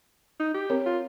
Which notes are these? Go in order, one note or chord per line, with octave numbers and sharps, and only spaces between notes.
D#4
G4
C4 A#4 C#5
F4